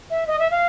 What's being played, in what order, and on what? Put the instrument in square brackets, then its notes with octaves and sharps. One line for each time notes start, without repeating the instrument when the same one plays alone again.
[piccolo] E5
D#5
E5
F5